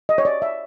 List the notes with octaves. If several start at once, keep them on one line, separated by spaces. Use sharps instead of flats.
D#5
C#5
D5
E5